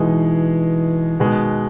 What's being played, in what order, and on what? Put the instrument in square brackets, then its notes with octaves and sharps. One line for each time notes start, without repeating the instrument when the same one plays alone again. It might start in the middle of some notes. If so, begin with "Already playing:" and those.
Already playing: [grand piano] B2 G#3 D#4 G#4 [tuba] E3
[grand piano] B2 G#3 B3 [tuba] D#3